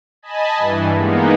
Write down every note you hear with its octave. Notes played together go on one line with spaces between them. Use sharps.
D#5 G#5 A5 B5
G2 E3
G#3 A#3 B3 D#4